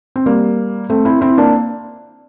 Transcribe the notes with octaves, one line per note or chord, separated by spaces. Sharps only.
C4
G3 A#3
A3 C4
C4 E4
C4 E4
A#3 D4